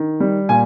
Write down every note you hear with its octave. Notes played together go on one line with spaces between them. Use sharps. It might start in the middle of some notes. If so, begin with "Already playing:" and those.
Already playing: D#3
G3
A#2 G#5